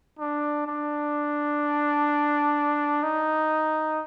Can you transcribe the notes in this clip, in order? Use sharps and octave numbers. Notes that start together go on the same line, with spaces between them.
D4
D4
D#4